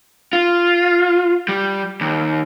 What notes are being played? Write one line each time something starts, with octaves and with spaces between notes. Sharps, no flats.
F4
G3
D#2